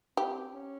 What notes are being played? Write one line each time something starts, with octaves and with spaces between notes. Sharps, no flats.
C4 G4
C#4